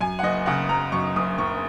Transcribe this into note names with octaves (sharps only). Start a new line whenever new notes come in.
F#2 G#5
F#5
F#1 D#5
C#3 F#5
F#1 A#5
F#2 C#6
F#1 D#6
F#1 C#6